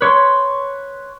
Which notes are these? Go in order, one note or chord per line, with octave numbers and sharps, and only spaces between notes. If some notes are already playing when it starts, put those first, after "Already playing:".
B4 C#5 C6